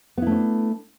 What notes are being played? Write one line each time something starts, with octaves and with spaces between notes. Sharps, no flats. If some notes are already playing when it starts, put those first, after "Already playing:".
A3 B3 C#4 D4 E4